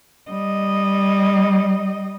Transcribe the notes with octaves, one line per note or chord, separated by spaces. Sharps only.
G3 D#5